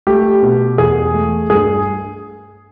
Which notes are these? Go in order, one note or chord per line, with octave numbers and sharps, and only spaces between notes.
A3 G4
B2
E2 G#4
A3
G2 G#4